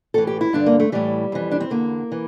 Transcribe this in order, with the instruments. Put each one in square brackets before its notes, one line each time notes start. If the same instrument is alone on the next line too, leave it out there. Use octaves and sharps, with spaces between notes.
[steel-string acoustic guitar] A2 E3 A4
G4
E4
G2 D3 D4
A#3
A3
A2 E3 G3
F2 E3
D4
C4
E2 D3 A#3
E3